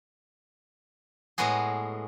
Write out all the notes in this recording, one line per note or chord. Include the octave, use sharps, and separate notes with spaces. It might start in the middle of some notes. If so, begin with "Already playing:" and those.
A2 G#3 B3 F#4 G#4